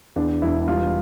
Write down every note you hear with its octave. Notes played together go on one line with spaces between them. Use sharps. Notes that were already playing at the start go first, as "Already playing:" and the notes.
E2 D4
E1 E4
G3 F4